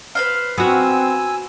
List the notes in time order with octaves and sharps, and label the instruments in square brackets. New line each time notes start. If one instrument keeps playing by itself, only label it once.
[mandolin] B4 C5 F5
[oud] B3 F#4 [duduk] C4 [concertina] G#5 E6